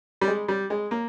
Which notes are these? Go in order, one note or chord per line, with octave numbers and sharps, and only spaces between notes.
G3
G#3
G3
G#3
A#3